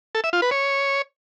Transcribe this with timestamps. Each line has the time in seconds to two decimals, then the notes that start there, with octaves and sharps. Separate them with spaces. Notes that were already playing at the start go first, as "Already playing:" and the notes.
0.15 A4
0.24 E5
0.33 F4
0.42 B4
0.51 C#5